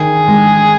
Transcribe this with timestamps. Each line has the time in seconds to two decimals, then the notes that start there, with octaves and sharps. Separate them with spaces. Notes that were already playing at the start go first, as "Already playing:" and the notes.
Already playing: D#3 G#4
0.28 G#3